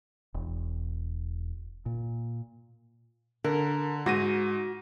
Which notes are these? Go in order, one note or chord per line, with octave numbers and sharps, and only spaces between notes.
E1
A#2
D3 A#4
G#2 F#4 A#6 D#7